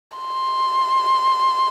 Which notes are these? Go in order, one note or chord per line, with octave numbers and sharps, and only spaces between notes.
C6